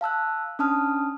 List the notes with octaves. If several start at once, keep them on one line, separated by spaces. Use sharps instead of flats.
F5 A5 E6 F#6
C#4 D4 A5 D#6 F6